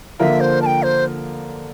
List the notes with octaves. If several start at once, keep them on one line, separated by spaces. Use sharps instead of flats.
D3 F3 A#3 F4 A#4 E5
C5
A5
G5
C5